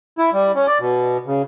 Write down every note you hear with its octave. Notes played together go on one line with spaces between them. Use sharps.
E4
G3
C#4
D5
B2
C#3